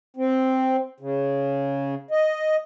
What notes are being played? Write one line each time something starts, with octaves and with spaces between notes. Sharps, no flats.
C4
C#3
D#5